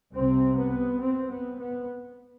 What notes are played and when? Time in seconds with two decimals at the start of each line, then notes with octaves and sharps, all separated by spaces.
0.12 C2 C3 C4
0.56 B3
1.00 C4
1.30 B3
1.59 B3